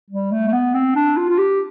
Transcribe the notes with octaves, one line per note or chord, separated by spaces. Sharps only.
G3
A3
A3
B3
C4
D4
F4
F4
G4